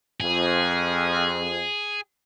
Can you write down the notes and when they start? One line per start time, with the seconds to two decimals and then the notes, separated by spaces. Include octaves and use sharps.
0.20 F2 G#4